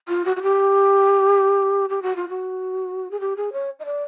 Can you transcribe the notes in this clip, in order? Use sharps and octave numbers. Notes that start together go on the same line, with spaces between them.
F4
F#4
F#4
G4
G4
F#4
F4
F#4
G#4
G4
G#4
C#5
D#5
D5